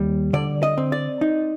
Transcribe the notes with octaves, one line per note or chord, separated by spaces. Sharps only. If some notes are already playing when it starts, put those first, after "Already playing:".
Already playing: D#2 G3
D3 D5
D#5
C4
D5
D#4